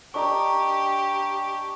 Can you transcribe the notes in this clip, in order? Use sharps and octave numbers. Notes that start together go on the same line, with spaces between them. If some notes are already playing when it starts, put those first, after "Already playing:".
D4 G4 D#5 A#5 C#6